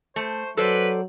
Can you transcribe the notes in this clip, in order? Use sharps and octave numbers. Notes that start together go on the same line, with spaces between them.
A3 C5
F#3 A4 B4 C5 D5